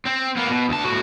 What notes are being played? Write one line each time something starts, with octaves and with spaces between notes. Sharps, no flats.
C4
A#3 B3
B2
D2 A5
A2 F#4